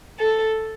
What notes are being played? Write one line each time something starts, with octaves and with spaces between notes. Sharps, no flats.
A4